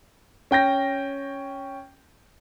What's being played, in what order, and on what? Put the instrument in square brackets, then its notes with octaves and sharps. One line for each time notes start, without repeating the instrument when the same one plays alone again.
[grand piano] C#4 G5 G6 A#6